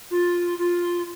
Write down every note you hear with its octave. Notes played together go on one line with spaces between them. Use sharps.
F4
F4